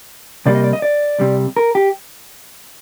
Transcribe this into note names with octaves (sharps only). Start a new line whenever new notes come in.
C2 C3 G3 A#3 D5
D#5
D5
D#5
D5
C2 C3 G3
A#4
G4